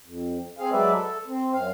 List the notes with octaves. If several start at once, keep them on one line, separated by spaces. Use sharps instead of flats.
F2
C4 G#4 F5
F#3 G#3 B4 D5 E5
A4
C4
F#2 F5